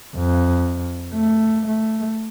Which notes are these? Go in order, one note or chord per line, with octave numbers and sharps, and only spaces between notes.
F2
A3
A3